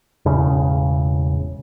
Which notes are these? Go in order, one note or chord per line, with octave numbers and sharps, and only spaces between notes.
E1 A2 C#3